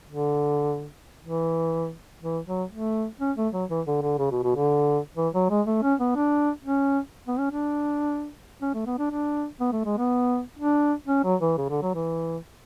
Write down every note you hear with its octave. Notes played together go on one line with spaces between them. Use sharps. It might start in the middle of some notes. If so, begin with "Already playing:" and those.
D3
E3
E3
F#3
A3
C#4
A3
F#3
E3
D3
D3
C#3
B2
B2
D3
E3
F#3
G#3
A3
C#4
B3
D4
C#4
B3
C#4
D4
C#4
A3
B3
D4
D4
B3
A3
G#3
B3
D4
C#4
F#3
E3
C#3
D3
F#3
E3